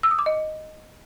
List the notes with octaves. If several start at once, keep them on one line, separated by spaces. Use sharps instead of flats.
E6
D#6
D6
D#5